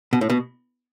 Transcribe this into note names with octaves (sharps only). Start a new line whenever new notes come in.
B2
A2
B2